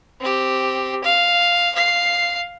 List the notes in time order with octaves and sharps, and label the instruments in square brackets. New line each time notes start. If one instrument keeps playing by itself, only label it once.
[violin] C4 G4
F5
F5 C7